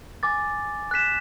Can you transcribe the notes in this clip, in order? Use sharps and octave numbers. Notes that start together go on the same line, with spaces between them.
G#5 D6 A6
F#6 B6 E7